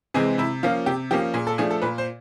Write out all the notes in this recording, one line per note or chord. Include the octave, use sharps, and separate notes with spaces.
C3 E3 G#3 C4 G#4
C3 E4
F3 A#3 C#4 F4
C3 G4
F3 A#3 C#4 G4
A#2 G#4
A4
F3 A3 D4 G#4
A4
A#2 B4
C5